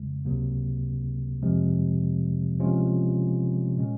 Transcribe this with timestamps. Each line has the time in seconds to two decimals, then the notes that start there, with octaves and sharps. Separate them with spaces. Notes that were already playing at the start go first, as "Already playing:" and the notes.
Already playing: F2 C#3 G#3
0.25 C#2 C3 F#3 A#3
1.42 F2 C3 F3 G#3
2.59 C3 F3 G#3 C#4 F4
3.76 A#2 G#3 C#4